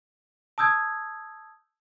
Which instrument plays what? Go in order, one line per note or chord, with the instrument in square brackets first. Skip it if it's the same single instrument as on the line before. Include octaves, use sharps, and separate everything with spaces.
[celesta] A5 D#6 E6 G6 G#6